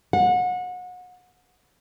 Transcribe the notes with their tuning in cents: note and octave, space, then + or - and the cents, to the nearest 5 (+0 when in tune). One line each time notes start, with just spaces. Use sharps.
F#5 -30